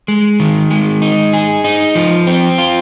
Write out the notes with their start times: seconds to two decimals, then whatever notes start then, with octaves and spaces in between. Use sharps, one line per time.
0.08 G#3
0.40 D#3
0.71 G#3
1.02 D#4
1.33 G#4
1.64 D#4
1.95 F3
2.27 C4
2.58 F4